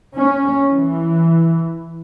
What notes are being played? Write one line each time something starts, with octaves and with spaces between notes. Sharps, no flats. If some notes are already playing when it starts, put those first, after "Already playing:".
C#4
E3